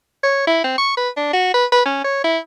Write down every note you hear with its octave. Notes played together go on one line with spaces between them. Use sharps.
C#5
E4
C4
C#6
B4
D4
F#4
B4
B4
C#4
C#5
E4